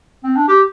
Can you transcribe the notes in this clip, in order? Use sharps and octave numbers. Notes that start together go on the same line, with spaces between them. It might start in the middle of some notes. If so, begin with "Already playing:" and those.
C4
D4
G4